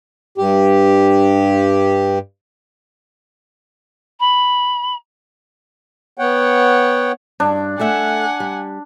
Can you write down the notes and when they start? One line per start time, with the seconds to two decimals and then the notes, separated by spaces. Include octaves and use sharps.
0.38 G2 G4
4.20 B5
6.18 B3 C#5 F#5 G5
7.40 G2 D4
7.80 A3 A4 E5 F#5 G#5
8.40 G3